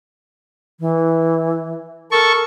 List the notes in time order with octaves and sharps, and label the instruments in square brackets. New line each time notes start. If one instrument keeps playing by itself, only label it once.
[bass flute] E3
[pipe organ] A4 C#6 [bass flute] A#4